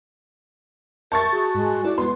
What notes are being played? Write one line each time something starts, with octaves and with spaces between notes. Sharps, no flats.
A#4 E5 A5 C#6 G6 A6
F#4 G#4
G#2 G#3
E4 A4 D5
G#3 B3 B4 C6